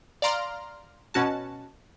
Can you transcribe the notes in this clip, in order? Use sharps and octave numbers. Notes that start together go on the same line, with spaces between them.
D5 F5 A#5 C6 F6
B2 C#4 F#4 A5